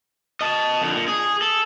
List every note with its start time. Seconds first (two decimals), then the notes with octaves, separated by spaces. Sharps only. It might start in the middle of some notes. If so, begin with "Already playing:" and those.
0.41 D#5 A5
0.82 F2 D3
0.95 A#2
1.08 G#4
1.42 A4